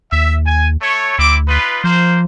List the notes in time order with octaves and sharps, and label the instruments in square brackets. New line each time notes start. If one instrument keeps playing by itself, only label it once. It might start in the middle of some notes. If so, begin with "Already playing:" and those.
[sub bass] D#2 [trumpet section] E5
[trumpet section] G#5
A3 C#5
[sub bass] D2 [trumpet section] C4 E4 D6
[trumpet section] D#4 F4 B4
[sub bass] F3 [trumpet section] A#3 C5